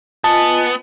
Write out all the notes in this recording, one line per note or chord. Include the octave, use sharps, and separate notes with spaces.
B3 F4 D#5 G#5 A5